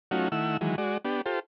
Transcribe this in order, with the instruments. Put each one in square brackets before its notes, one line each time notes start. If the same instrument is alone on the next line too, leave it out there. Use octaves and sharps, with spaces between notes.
[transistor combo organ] F#3 A3 C#4 D#4 F4 F#4
D#3 A3 E4 F#5 E6
D#3 E3 F#3 G#3
G#3 F#4 D5
B3 D4 G4
F4 G4 A4 C5